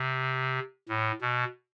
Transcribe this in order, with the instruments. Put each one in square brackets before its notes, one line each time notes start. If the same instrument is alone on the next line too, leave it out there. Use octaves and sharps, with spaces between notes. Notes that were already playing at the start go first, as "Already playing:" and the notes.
Already playing: [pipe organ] C3
A2
B2